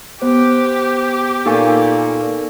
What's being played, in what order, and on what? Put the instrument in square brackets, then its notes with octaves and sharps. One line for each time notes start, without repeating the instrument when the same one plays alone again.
[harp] B3 [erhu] G4 [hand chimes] C5
[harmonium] A#2 A#3 [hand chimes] D#4 C#6 [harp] A4 F5 G#5